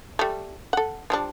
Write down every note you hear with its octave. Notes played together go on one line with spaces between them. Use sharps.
G3 A3
A4 F#5
F3 G3 D4